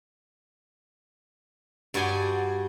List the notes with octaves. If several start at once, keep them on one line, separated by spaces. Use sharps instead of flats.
G2 F#4 D5 G#5 C6